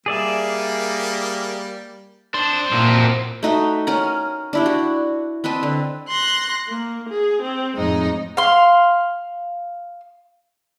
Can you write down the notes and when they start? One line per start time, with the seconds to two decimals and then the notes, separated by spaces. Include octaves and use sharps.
0.06 G3 A#3 G#4 D5 E5
2.34 F2 D4 C5
2.73 A#2 A#3 E4 F#4
3.43 A3 D#4 F#4 E5
3.87 C#4 A#4 F#5
4.53 D4 E4 G4
4.66 F#4
5.44 C4 B4 D#5 A5
5.63 D3
6.09 C6 F#6 A#6
6.68 A#3
7.09 G#4
7.42 C4
7.76 F2 A2 G#3 D#4 D#5
8.37 F5 C6